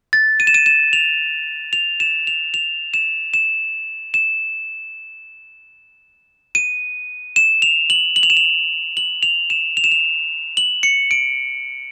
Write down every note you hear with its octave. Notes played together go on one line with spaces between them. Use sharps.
A6
D#7
E7
D#7
E7
F7
F7
E7
F7
F7
E7
E7
E7
D#7
E7
F7
F#7
F#7
F7
E7
F7
F#7
F7
E7
F7
E7
F7
F#7
C#7
D7